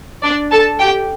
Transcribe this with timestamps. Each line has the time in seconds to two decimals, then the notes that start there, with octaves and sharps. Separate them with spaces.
0.22 D4 D5
0.51 A4 A5
0.79 G4 G5